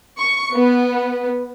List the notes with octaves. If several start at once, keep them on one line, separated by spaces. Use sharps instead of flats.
C#6
B3